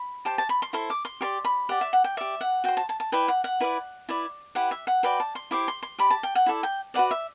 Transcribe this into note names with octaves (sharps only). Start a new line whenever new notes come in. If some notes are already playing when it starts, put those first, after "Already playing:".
Already playing: B5
G4 C5 A5
A5
B5
C6
E4 A4 C5 C6
D6
C6
G4 D5 C6
B5
G4 D5 F#5
E5
F#5
G5
G4 D5 E5
F#5
F#4 C5 G5
A5
A5
A5
E4 B4 D5 G5
F#5
F#5
E4 B4 D5
E4 B4 D5
E4 G4 B4 F#5
E5
F#5
F#4 B4 D5 G5
A5
C6
E4 G4 C5 D6
C6
C6
G4 D5 B5
A5
G5
F#5
E4 A4 D5
G5
F#4 B4 D5 F#5
E5